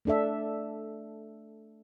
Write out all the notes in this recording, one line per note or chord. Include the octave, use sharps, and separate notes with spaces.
A3 D4 A4 E5